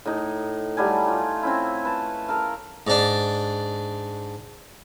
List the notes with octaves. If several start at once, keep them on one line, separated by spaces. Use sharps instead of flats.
A2 D#4
F#3 G3 A3 G#5
F4
C4 C#4 E4
B4 A5
A4 A#4 F5
G#2 D4